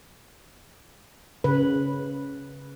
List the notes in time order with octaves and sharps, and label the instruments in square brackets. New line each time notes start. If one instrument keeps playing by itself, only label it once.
[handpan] C#3 B4